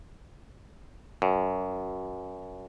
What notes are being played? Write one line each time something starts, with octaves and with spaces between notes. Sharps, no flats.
F#2